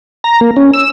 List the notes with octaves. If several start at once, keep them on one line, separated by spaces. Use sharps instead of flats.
A#5
A#3
C#4
E6